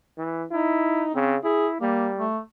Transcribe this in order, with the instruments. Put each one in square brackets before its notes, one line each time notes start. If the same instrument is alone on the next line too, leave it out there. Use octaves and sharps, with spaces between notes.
[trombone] E3
[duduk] D#4 [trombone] E4
[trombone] C#3 [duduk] C4
[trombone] E4 [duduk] G#4
[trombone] G3 [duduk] A#3
[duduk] A3